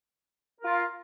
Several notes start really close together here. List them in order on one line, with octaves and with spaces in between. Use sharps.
A#4 F4 F5